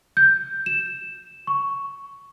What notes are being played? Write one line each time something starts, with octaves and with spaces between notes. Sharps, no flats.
G6
E7
C#6